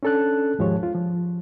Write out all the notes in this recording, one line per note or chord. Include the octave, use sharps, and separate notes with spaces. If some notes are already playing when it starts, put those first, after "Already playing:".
C#4 D4 A4 A5 F#6
D#2 G#2 F3 G#3 G4 C#5
F4
F3